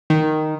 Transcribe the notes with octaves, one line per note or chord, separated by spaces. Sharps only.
D#3